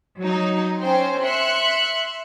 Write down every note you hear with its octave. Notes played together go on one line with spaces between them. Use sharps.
F#3 D#4
C4 C#4 C5
E5 C6 F#6 C#7